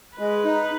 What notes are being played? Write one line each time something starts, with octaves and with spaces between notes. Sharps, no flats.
G#3 B4
D#4